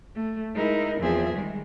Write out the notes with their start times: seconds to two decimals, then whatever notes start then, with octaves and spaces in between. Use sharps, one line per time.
0.15 A3
0.54 G#3 D#4 E4 A#4
0.99 E2 F3 C4 G#4 E5
1.33 D#3 G3 G#3